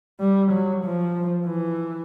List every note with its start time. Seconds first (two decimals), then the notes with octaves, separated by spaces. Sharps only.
0.20 G3
0.51 F#3
0.84 F3
1.47 E3